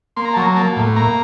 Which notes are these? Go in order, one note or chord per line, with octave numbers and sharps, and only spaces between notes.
A#3 C6
A#5
F#3 A5
A#5
A#3 A5
A2
A#3 A#5